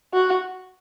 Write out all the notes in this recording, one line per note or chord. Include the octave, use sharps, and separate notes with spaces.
F#4